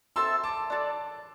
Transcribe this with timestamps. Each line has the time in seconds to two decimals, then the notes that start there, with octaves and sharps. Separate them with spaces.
0.16 C4 A4 E5 A5 C6 E6
0.43 A5 D6
0.70 D4 A4 D5